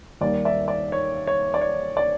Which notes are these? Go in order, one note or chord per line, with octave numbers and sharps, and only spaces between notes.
D#2 D#3 G3 A#3 D5
D5 E5
D5
C#5
C#5
D5
C#5
D5